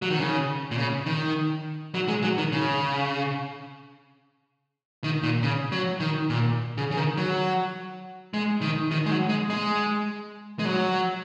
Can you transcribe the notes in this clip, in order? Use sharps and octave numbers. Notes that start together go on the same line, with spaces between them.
F#3
D#3
C#3
A#2
C#3
D#3
F#3
G#3
F#3
D#3
C#3
D#3
A#2
C#3
F#3
D#3
A#2
C#3
C#3
D#3
F#3
G#3
D#3
D#3
G#3
F#3
G#3
G#3
G#3
F#3